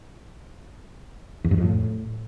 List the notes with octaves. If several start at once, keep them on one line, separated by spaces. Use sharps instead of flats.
E2
G2
F2
A2